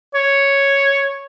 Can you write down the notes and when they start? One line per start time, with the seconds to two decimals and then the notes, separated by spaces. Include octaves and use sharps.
0.14 C#5